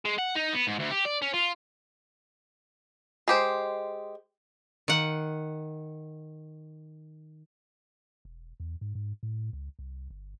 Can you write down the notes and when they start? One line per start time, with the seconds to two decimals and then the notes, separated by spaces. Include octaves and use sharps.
0.05 G#3
0.19 F#5
0.36 D#4
0.54 B3
0.68 G#2
0.80 D2
0.91 G4
1.05 D5
1.22 C#4
1.34 F4
3.28 G#3 G4 C5
4.88 D#3 F#5
8.25 E1
8.60 E2
8.81 G#2
8.95 G#2
9.23 A2
9.53 C#2
9.79 C2
10.10 G1